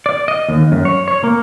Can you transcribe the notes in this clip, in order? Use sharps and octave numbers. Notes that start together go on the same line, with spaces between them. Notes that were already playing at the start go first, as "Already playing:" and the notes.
D5
D#5
D#2
F#2
C#5
C#5
A#3